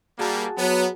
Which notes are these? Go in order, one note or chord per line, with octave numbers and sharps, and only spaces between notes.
G3 A#3 F#4 G#4 A5
F#3 B3